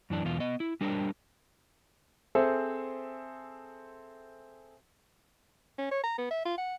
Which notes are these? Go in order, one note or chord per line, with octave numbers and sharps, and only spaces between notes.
F#2 E3 D4
E2 B2 F4
B3 D#5
E4
G3 D4 A#4 C5
C4 G#4 A4 C5 E5
C#4
C#5
A#5
B3
E5
F4
F#5